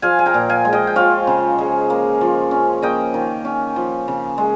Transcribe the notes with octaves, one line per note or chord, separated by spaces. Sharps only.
F3 F5 G#5
G#5
G5 A#5
A#2
F5 G#5
G#3
D#5 G5
G5
F3 C#5 F5
C#3
G#3
A#3
F3
C#4
A#3 D#5 G5
D#3
C#4
F3
C#3
G#3